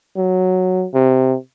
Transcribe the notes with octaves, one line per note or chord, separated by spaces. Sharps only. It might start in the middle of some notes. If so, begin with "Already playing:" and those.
F#3
C3